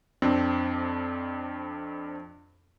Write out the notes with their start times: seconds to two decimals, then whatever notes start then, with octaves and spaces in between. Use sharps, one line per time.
0.22 F2 C4 D4